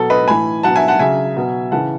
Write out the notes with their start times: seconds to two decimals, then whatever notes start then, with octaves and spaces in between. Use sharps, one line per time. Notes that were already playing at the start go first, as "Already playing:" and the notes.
Already playing: B2 F#3 A4
0.10 B4 D#5
0.28 A2 E3 G#5 B5
0.63 B2 F#3 F#5 A5
0.76 E5 G#5
0.88 F#5 A5
0.99 C#3 F#3 E5 G#5
1.36 B2 F#3
1.72 C#3 E3 F#5 A5